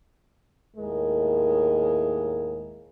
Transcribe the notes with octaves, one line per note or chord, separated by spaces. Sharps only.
D#2 A2 G#3 A#4